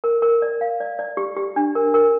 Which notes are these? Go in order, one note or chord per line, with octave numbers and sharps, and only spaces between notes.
A#4
A#4
D5
F5
D5
D5
G4
G4
D4
A#4
A#4